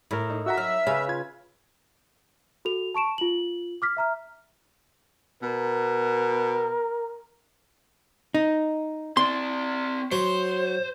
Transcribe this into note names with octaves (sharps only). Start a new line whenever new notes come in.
A2 E4 A#4
D#4
F#4 E5 F#5 A#5 E6
F#3 F6
C#3 B4 F5
F4 G#6
F#4 A4 F7
A5 C#6 D7 E7
F4 F#7
D6 F6 B6
E5 A#5 F6
B2 A#4
D#4
C4 D5 C6
F#3 C5